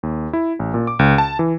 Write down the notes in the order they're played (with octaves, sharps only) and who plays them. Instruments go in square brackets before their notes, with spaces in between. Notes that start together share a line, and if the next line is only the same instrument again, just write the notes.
[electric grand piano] D#2
E4
A1
A#2
D6
C#2
A5
E3